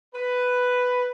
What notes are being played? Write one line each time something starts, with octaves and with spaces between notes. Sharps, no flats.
B4